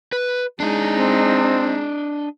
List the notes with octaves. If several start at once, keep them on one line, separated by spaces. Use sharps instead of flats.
B4
G#3 D4 D#4 D#5
C4